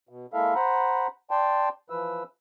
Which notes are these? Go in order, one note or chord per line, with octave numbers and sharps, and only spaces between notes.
B2
G#3 A#3 E4 A4 E5 F5
C5 F#5 A#5 B5
D5 G5 A5 C6
E3 F3 B4 E6